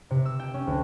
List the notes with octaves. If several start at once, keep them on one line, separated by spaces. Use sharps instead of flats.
C3
E6
G5
C#4
D2